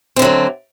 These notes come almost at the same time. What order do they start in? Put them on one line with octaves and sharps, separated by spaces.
C4 D3 F#3 A3